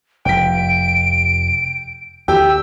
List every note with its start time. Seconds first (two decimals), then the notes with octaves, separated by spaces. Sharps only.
0.25 F1 G5 B6 D7
2.28 D2 G4 G5 E6